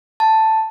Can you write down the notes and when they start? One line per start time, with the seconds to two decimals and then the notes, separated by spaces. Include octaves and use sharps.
0.20 A5